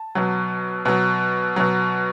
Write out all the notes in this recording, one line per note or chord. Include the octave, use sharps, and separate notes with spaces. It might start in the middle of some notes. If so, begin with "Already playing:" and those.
Already playing: A5
B2 F#3
B2 F#3
B2 F#3